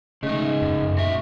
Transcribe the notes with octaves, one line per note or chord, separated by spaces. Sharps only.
C#3 G#3 A3 D#4
F#2
A#2 F#4 E5